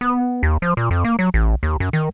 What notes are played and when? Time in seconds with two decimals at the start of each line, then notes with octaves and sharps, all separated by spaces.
0.01 B3
0.43 D#2
0.62 F3
0.77 A#2
0.91 F2
1.04 A#3
1.19 F#3
1.34 A1
1.63 D#2
1.80 F#2
1.93 D#3